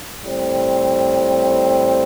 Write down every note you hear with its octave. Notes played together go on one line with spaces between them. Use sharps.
A2 G3 C4